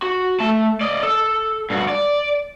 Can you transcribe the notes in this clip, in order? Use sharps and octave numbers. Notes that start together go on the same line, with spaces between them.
F#4
A3 A5
D5 D#5
A4
G2 F#4
D5